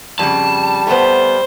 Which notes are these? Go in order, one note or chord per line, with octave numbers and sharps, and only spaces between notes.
F2 C#3 G3 A5
A3 B3 C5